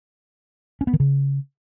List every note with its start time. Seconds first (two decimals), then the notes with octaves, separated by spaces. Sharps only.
0.81 C#4
0.87 B3
0.93 D#3
1.00 C#3